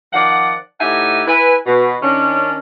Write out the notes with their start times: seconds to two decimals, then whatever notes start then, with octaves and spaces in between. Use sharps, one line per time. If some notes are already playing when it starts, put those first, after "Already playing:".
0.13 D#3 F3 D5 F#5
0.80 A2 D#4 G4 E5 F#5 G#5
1.27 E4 B4 G#5
1.66 B2
2.02 D#3 C#4 D4